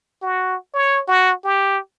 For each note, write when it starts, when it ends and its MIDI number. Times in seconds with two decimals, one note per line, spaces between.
0.22 0.56 66
0.74 1.01 73
1.08 1.33 66
1.44 1.78 67